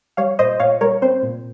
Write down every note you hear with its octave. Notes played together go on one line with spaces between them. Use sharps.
G3 C#5 F5
A#2 C5 D#5
A#2 C#5 F5
G3 A#4 C#5
C4 C5
A#2